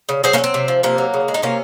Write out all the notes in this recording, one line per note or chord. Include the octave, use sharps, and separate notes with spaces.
C#3
F#3 G#4 C5
A#3 C#4
F#3
C4
C3
F3
C3 A#3
F#3
C#3
G#3
D#4
C3 A#3 C#4